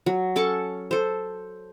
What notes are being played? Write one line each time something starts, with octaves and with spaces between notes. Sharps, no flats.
F#3
C#4 A4 A5 C#6
A4 C5